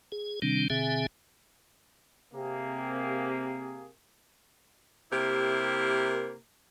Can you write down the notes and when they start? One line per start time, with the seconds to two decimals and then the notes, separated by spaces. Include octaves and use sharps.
0.12 G#4
0.42 C3 D#3 G3 C4 D4
0.70 B2 D3 C4 G#4 E5 G#5
2.34 C3 A#3 G4 G#4
5.11 C3 A#3 E4 G4 A#4